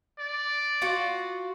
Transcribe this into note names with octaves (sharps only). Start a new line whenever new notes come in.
D5
F4 F#4